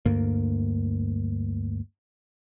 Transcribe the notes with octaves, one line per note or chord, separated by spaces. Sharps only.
D2 G2 A#3